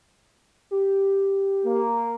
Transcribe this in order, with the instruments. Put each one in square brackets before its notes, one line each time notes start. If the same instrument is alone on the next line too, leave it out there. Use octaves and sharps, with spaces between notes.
[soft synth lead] G4
[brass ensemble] A#3